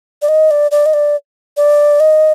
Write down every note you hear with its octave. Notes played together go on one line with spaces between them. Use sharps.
D5
D#5
D5
D5
D#5
D5
D5
D#5